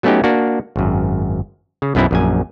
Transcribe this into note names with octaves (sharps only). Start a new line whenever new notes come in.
F#3 A3 B3 C#4 D#4 G4
A#3 D4 F#4
G#1 F#2
C#3
B1 F#2 B3 C4 E4
A#1 F#2 G#5